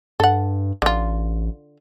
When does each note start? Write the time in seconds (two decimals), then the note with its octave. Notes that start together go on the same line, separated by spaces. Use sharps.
0.20 G2 A4 F#5
0.82 A1 D3 F4